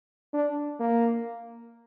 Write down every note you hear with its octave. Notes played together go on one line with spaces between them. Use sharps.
D4
A#3